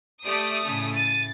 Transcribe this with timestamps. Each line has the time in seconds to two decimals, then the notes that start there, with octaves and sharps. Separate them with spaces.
0.24 A3 G4 D5 D#6
0.64 A2 C#3
0.96 A6 D#7